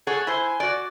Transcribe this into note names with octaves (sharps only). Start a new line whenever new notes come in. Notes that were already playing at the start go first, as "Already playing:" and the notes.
G#4 A4 C#5 F#5
E4 C5 G#5
F#4 D5